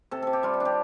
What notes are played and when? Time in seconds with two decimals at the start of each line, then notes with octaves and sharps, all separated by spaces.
0.11 C3 A4
0.22 C3 A4
0.33 G4
0.43 G3 F4
0.54 F4
0.60 D4
0.65 G4